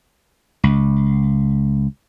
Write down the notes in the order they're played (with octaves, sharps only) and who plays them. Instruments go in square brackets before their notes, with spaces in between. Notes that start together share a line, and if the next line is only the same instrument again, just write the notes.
[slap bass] C#2